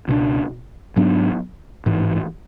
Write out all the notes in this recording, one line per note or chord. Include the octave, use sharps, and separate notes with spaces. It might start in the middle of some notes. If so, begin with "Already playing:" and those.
C#2 B2 A3 D4
G#2 F#3 B3 D4
A1 G#2 E3